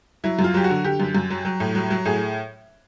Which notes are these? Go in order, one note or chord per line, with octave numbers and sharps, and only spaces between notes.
F#3 E4
F#2
F4
F#3 G4
F#4
D3
D3 G4
F#2
F#2
F#3
F#3
A2
F#3
F#3
A2 G#4